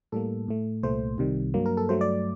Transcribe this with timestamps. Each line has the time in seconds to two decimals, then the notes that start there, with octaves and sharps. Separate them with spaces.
0.12 A2 G3 A#3 A4
0.48 A2 A3
0.83 C2 A#2 A3 C5
1.18 C2 C3 D#3 G3
1.54 G2 F#3 A#3
1.66 A#4
1.77 A4
1.89 G2 F#3 A3 C5
2.01 D5